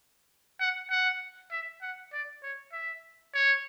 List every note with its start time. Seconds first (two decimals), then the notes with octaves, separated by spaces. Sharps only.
0.61 F#5
0.91 F#5
1.52 E5
1.82 F#5
2.13 D5
2.43 C#5
2.73 E5
3.34 C#5